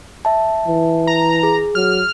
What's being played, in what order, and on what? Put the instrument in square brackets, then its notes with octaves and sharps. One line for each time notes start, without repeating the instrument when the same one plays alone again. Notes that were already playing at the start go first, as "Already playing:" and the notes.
[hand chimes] E5 A5
[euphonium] E3
[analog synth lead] A#5
[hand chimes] G#4
[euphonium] F#3 [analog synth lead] F6